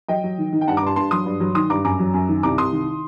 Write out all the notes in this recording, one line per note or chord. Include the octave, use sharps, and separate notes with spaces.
F#3 D#5 G5
F#3
D#3
D#3
G5
G2 F#5 A5
A#5 D6
G2 A5 C6
G2 A5 C6
F#3 C6 D#6
G2
F#3
D#3 C6 D#6
G2 A#5 D6
F#2 A#5 D6
F#3
F#2
D#3
C2 A#5 D6
C2 C6 D#6
D#3